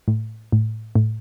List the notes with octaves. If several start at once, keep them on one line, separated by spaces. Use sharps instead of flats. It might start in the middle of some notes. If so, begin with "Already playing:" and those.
A2
A2
A2